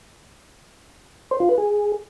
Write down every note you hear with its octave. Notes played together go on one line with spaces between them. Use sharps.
C5
F4
B4
G#4